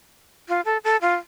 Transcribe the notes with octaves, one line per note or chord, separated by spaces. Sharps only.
F4
A4
A4
F4